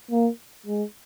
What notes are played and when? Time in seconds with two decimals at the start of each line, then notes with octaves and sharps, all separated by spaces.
0.11 A#3
0.66 G#3